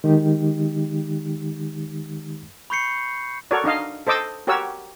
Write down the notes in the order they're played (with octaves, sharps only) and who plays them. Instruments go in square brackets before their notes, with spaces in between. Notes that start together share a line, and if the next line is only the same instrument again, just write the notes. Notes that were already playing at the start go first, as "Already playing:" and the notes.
[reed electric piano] D#3 G#3 D#4 G4
[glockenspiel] B5 C#6 G6 C7 C#7
[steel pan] F#4 A4 A#4 C#5 D5
D4 D#4 D#5 F5
A4 C5 D#5 D6 E6
F#4 G4 A#4 C#5 F#5 E6